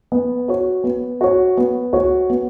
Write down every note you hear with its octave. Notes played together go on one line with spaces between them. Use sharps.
B3
F#4 C#5
B3
F#4 C#5
B3
F#4 C#5
B3